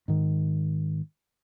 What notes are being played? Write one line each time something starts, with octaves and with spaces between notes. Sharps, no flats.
G#2 D#3